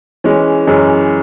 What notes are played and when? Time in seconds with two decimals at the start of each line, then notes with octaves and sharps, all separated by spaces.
0.24 E3 G#3 C#4
0.67 F#2 E3 G#3 C#4